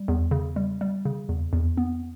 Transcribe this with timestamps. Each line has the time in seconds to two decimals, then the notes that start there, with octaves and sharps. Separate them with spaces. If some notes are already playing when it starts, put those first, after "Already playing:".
Already playing: G3
0.08 E2
0.31 C#3
0.56 G3
0.81 G3
1.05 C#3
1.29 E2
1.53 E2
1.77 B3